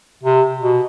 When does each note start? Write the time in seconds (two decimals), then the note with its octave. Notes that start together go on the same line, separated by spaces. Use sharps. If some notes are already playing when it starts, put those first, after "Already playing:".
0.24 C3
0.61 B2